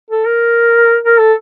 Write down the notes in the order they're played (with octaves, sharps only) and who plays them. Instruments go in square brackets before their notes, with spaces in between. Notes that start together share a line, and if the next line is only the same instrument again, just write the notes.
[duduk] A4
A#4
A#4
A4